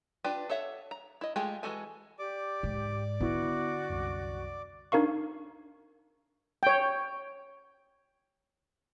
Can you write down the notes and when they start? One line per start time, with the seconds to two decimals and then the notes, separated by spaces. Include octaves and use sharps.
0.24 D4 F4 G4 B4
0.50 A4 C#5 E5 F#5
0.91 A#5
1.21 E4 D#5
1.36 G#3 A3 F4 G4 G#4
1.63 E3 G#3 F#4 A4 G#5
2.19 G4 D5 D6
2.63 G#2
3.20 D3 B3 E4 F#4
3.89 C2 F#2
4.92 D4 D#4 A#4 F5 C#6
6.63 C#5 G5